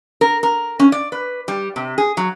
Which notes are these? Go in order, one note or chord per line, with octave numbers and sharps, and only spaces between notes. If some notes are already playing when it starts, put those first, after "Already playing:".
A#4
A#4
C#4
D5
B4
G3
C3
G#4
F#3